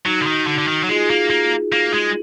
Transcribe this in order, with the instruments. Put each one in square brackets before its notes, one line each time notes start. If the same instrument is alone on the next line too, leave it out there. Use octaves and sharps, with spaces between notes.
[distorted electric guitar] F#3 [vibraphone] D#4 F#4
[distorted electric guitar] D3
D#3
D3
D3
D#3
F#3
[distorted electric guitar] G#3 [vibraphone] F4 G#4
[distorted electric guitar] A#3
A#3
A#3
G#3